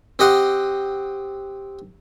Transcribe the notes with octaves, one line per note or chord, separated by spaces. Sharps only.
C4 G4 D#5 F#5 C6